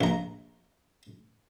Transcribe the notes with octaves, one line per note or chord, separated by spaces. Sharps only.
A#1 A#5